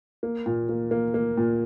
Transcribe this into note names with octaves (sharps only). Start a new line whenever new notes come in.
A#3
A#2
A#3
A#3
A#3
A#2